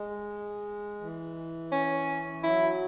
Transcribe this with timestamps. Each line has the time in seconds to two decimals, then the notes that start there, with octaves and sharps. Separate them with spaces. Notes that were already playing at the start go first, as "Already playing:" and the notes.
Already playing: G#3
1.01 E3
1.72 C#4
2.43 F#3 E4